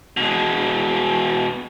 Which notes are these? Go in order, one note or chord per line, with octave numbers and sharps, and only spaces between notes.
B2 G#3